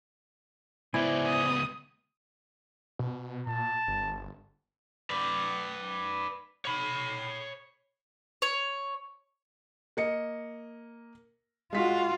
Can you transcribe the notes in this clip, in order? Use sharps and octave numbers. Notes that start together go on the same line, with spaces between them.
C#2 B3 E4 C5 D5 G#5
D#6
B2
A#2 A5
G1
B4 D5
C#5 B5
C#5
A#3 D#5 C#7
G#3 F4 F#4 B6